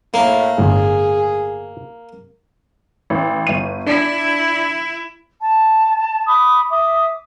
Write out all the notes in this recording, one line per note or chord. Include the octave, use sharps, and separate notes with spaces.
A2 A#3
G1 A2 G#4
A1
G1 D#7
D4 E4
A5
B5 D6 D#6
E5 D6 D#6